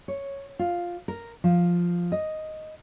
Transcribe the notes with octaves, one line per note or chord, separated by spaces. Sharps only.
C#5
F4
A#4
F3
D#5